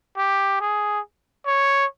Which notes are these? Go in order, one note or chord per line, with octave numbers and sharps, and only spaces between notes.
G4
G#4
C#5